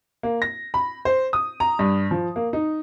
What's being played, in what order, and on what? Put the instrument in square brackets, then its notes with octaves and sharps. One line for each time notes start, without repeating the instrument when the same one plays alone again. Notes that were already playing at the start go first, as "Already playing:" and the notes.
[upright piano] A#3
A#6
B5
C5
D#6
A#5
G2
F3
A#3
D#4